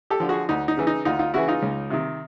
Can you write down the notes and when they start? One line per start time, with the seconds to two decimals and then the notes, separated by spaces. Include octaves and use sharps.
0.10 G4 A4
0.20 D3 F3
0.29 F#4 G#4
0.49 D2 D#4
0.68 D#4
0.77 C#3 E3
0.87 D#4
1.05 D2 D#4 F4
1.19 D#4 F4
1.34 C#3 E3 E4 F#4
1.48 D#4 F4
1.62 C#2
1.90 C3 D#3